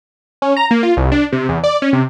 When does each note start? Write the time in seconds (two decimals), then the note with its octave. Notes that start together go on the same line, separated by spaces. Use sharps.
0.42 C#4
0.57 A#5
0.71 A#3
0.83 F4
0.97 C2
1.12 D4
1.33 C3
1.49 E2
1.64 D5
1.82 C#4
1.93 C3